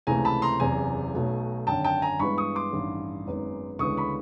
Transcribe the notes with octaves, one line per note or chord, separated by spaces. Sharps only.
C#2 C3 E3 A3 G#5 A#5
A5 B5
A#5 C6
F#1 E2 C3 G#5 A#5
B1 B2 F#3 A3
G#1 F#2 D3 G5 A5
G5 A5
G#5 A#5
G2 E3 G#3 B3 B5 C#6
C#6 D#6
C6 D6
A1 G2 D#3
G#1 F#2 D#3 G#3 B3
D2 C#3 E3 G#3 B3 C#6 D#6
B5 C#6